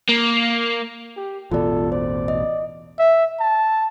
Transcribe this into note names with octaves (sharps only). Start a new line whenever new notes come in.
A#3
G4
A1 E2 B2 F4 A4 D5
C5 D5
D#5
E5
A5